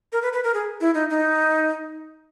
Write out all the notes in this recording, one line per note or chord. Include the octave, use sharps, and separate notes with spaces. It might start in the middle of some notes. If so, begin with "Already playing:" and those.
A#4
B4
B4
A#4
G#4
E4
D#4
D#4